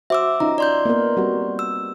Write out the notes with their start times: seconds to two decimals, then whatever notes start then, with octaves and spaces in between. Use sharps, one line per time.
0.10 F#4 C5 E5 D6 E6
0.40 C#4 D#4 F4 A#5
0.58 D5 C6 G6
0.85 A#3 B3 A#4
1.17 G3 C4 F#4
1.59 E6